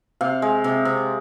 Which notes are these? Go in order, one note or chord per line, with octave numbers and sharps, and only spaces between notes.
C3 F5
G#3
C3
C3